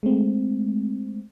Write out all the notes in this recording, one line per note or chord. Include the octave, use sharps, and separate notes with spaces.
G#3 A3 C4